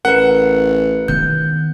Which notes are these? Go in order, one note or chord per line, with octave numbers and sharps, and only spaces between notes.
A1 A#4 B4 F#5
D#3 B3 G6